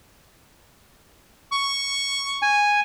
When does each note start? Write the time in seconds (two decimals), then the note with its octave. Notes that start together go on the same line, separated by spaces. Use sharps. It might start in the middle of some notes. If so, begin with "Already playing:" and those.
1.52 C#6
2.42 G#5